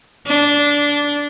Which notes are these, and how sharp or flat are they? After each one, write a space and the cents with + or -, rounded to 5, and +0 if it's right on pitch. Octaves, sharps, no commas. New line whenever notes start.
D4 -15